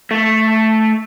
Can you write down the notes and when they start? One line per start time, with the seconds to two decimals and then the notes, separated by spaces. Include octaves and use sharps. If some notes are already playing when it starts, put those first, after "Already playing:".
0.11 A3